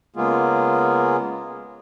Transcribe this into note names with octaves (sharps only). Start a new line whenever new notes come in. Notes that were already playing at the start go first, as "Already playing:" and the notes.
C#3 G#3 A#3 B3 F4 G#4